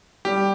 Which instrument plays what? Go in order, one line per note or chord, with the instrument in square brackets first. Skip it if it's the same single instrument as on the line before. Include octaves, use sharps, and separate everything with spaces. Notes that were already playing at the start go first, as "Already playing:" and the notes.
[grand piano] G3 [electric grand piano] G4